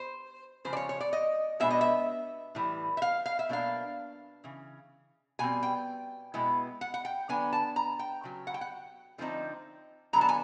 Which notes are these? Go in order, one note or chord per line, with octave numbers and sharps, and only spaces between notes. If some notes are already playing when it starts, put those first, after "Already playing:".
Already playing: C5
C#3 F3 G#3 C5
D5
C#5
C#5
D5
D#5
B2 G#3 B3 D4 E5
D#5
E5
A2 E3 G3
E5
F5
F5
E5
B2 F#3 A#3 D4 F5
C#3 E3
B2 G3 C4 G#5
G5
B2 G#3 B3 E4
F#5
F#5
G5
D3 F#3 B3 D4 G#5
A5
A#5
G5
C#3 F#3
F#5
G5
F#5
D3 F3 A3 C4 D#4
D3 F#3 B3 A#5
A5
G#5